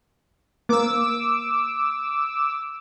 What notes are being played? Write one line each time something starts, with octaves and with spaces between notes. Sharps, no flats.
A#3 D6 E6